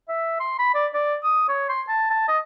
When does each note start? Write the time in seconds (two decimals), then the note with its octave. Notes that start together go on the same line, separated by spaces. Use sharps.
0.08 E5
0.40 C6
0.59 B5
0.74 D5
0.94 D5
1.23 D#6
1.48 C#5
1.69 C6
1.88 A5
2.10 A5
2.28 D#5